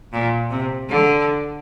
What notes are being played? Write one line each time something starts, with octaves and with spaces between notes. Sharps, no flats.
A#2
C3
D3